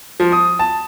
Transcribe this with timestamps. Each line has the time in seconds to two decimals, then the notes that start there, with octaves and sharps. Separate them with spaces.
0.20 F3
0.32 D#6
0.59 A5